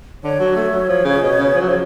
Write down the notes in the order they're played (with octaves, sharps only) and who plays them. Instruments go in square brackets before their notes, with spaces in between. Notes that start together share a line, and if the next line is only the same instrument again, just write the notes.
[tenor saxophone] D3 [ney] C#5
[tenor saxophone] F#3
A3
F#3
F3
C#3
B2
C#3
F3
F#3
F3